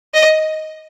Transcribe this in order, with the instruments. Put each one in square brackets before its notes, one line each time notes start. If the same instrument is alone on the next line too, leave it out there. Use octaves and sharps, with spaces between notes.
[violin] D#5